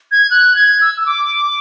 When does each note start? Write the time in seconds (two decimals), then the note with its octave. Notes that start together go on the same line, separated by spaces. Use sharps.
0.12 G#6
0.31 F#6
0.56 G#6
0.81 E6
1.01 E6
1.06 D6